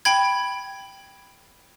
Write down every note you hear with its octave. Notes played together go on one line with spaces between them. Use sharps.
G5 B5 G#6